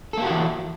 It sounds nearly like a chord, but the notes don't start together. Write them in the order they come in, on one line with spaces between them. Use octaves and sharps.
A4 A#3 G4 F#4 E3